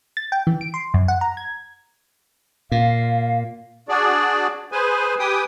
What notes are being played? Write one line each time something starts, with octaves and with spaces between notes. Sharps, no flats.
A6
G5
E3
D7
C6
F#2
F#5
A#5
G#6
A#2 F5
D4 F#4 G#4 D5
G#4 B4 C5 G#5
G4 B4 G5 G#5 D#6